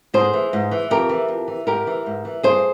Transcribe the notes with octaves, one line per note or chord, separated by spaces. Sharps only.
G#2 G#4 C5
E3
G#2
E3
F2 G4 A#4
E3
F2
E3
G#2 G4 A#4
E3
G#2
E3
G2 G#4 C5